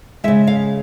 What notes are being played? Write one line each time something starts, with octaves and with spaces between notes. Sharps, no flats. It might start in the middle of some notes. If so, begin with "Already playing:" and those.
C#3 E3 G#3 E5
F5